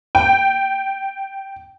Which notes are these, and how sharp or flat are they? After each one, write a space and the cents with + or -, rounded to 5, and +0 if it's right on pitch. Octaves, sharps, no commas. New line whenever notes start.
G5 -10